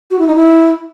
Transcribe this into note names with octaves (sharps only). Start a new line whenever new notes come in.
F#4
E4
D#4
E4